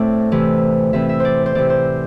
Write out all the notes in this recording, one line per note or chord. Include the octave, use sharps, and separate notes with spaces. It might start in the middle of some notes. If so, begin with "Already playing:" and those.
Already playing: A2 A3 C4 D5 E5
C3 E3 C4
C3 E3 C4 E5
E5
C5 D5
C5
C3 E3 C4 D5
C5